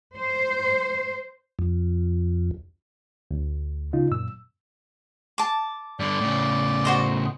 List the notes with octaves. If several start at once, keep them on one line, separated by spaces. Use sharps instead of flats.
C5
F2
D2
C#3 D#4 F4
F#2 A#2 E6
A5 D6
G2 D3 D5
A2 C#3
F#4 C5 D#5